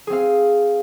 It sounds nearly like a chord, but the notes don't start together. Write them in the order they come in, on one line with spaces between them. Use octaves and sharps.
G#4 C4 F5